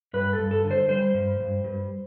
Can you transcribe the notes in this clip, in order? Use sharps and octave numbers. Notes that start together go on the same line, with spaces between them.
G2 B4
A4
G2
A4
D3
C5
G3 C5
G2
G2
G2